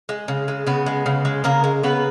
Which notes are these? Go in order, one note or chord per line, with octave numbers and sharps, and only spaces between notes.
G#3
C#3
G#3
C#3 B3
G#3
C#3
G#3
C#3 A#3 A#4
G#3
C#3 B3 B4